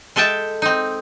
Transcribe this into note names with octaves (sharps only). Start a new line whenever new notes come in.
G#3 A4 E5 G5 A5
C4 D#4